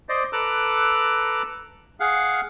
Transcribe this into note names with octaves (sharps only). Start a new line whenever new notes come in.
C5 D5 D#5
A4 B4 A#5 D6 E6 F#6
G#4 F5 F#5